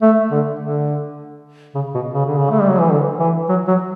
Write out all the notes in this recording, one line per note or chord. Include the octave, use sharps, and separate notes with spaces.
A3
D3
D3
C#3
B2
C#3
D3
C#3
A3
G3
F#3
E3
D3
E3
F#3
F#3